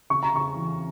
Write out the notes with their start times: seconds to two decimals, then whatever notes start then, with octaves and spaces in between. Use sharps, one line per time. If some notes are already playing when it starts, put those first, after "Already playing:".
0.10 C#3 C#6
0.23 A#5
0.33 C#3 C#6
0.55 E3